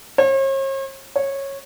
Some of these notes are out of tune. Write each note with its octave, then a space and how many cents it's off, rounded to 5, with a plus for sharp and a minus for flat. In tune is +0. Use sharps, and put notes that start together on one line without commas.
C#5 -45
C#5 -15